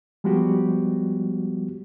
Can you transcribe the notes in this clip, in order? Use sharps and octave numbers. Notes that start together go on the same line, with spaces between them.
F3 G3 G#3 B3 F#4 G4